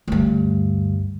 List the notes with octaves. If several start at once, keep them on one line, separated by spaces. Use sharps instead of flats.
D2 G2